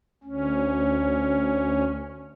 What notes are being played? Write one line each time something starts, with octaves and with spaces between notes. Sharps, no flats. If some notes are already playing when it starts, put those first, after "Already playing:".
D2 C#4